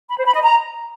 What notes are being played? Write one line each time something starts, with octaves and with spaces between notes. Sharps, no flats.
B5
C5
B5
D#5
A#5